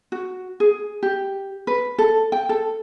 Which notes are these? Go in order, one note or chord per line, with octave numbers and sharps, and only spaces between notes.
F#4
G#4
G4
B4
A4
G5
A4